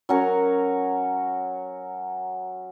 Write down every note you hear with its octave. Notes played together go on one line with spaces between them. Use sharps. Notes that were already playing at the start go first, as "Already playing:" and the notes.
F#3 C#4 A#4